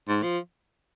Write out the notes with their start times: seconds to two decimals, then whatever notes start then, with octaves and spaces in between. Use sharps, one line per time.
0.08 G#2
0.23 F3